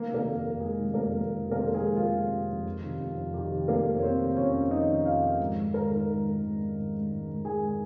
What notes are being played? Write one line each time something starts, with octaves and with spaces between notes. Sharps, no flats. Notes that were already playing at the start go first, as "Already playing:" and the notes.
Already playing: D#3 A#3 A#4
C3
A#3 A#4
F2
F2
D#3 G#3 G#4
C3
F2 A#3 A#4
F2
D#3
C3
A#3 A#4
C5
F2 A#4
G#3 G#4
F2
D#3 F4
C3
F2
F2
D#3
C3
F2
F2
D#3 G4
C3
F2 A#3 A#4
F2
C#5
D#3 C4 C5
C3
F2 C#4 C#5
F2
D#3 D#4 D#5
C3
F2 F4 F5
F2
G#2
D#3
G#2 A#4 A#5
D#3
G#2
D#3
G#2
D#3
G#2
D#3
G#2
D#3
G#2 G#4 G#5
D#3